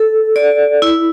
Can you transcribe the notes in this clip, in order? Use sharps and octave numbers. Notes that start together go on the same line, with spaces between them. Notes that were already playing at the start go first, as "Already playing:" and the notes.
Already playing: A4
D5
E4